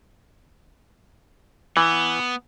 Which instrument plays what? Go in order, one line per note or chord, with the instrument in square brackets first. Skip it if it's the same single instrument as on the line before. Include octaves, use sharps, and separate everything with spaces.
[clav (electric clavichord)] E3 [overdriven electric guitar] B3